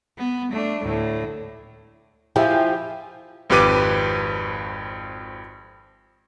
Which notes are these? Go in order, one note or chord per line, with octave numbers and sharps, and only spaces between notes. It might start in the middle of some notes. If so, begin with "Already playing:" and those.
B3
A3 D4
D2 A2
F3 E4 G4 E5 G#5
G#1 F2 G4 B4 D6 D#7